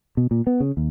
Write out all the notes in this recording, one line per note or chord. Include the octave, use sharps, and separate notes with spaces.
B2
A#2
B3
C#3
D#2